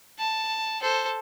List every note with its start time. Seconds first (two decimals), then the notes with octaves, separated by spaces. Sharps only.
0.18 A5
0.81 A4 C5